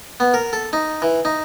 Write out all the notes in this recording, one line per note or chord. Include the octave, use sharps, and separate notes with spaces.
B3
A#4
A4
D#4
E3
D#4